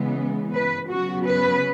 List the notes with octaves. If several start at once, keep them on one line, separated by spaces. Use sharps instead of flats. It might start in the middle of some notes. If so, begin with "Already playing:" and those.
Already playing: C#3 E3 G#3 B3
B4
C#3 F#3 B3 F#4
B4